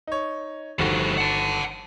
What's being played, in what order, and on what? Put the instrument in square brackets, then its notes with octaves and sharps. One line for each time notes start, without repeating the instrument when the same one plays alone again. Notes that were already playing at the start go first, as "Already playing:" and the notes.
[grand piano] D#4 C#5
[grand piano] G1 D#3 F#4 [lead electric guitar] F3 G3
[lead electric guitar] F#5 A5